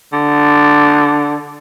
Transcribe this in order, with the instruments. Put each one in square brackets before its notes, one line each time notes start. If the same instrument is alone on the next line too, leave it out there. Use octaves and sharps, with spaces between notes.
[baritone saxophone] D3